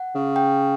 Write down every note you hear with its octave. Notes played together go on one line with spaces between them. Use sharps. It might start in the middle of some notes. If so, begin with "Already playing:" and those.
Already playing: F#5
C#3
G5